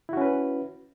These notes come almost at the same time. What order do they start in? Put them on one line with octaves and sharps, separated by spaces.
E4 F#4 C#4 B4